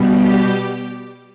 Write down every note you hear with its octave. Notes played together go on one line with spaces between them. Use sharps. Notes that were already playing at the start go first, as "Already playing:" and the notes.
Already playing: B2 G3
G4